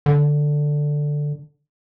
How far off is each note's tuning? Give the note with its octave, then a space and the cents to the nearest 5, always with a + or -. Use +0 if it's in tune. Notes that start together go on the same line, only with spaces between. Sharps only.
D3 +5